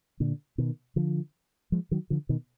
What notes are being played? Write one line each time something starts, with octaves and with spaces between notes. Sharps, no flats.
A#2 D3
B2 D#3
D3 F3
F3 G#3
D#3 F#3
D3 F3
B2 D#3